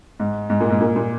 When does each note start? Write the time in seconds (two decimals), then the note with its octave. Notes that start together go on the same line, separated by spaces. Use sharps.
0.20 G#2
0.50 G#2
0.60 A#2
0.70 G#2
0.81 A#2
0.96 A#2